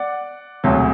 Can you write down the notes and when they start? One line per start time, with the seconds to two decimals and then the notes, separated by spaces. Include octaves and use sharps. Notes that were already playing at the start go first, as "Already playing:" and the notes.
Already playing: D5 F#5
0.64 E1 D2 C3 F#3